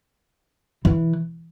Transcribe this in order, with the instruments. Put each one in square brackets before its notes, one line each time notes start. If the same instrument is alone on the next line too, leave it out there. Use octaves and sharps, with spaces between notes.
[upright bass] E3